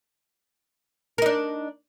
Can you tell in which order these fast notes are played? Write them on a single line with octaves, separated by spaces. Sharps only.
A#4 D#4 D4